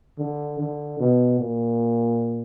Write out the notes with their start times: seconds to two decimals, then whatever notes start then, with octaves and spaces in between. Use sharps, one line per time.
0.19 D3
0.59 D3
1.00 B2
1.40 A#2